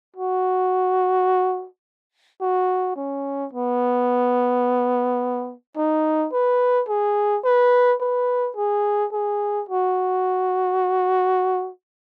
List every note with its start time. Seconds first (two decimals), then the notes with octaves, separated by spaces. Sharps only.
0.16 F#4
2.41 F#4
2.97 C#4
3.53 B3
5.77 D#4
6.33 B4
6.89 G#4
7.45 B4
8.01 B4
8.57 G#4
9.13 G#4
9.69 F#4